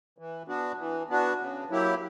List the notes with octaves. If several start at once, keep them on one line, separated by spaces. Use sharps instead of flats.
E3
B3 D4 F#4
E3
B3 D4 F#4
C#3
F#3 A#3 E4 G4